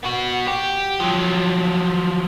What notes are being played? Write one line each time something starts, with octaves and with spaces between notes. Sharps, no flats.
B3 F#4
G4
F3 F#3